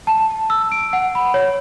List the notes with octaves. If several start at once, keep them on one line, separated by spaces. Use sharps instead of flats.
A5
E6
D7
F#5
B5
C#5